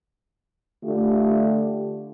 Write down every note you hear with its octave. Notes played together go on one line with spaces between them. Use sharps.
D3 A3 F4 G4